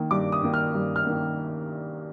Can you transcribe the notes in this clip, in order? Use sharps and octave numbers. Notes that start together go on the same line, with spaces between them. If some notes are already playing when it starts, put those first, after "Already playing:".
Already playing: D#3 A#3
G2 D6
D#6
D#3 A#3
F6
G2
F6
D#3 A#3